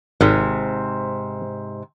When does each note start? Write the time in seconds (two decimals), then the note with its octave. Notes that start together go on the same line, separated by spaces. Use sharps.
0.21 G#1 G#2 C3